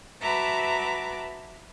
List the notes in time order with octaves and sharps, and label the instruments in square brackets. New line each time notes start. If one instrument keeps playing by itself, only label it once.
[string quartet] F#4 B4 E5 A5 A#5 D6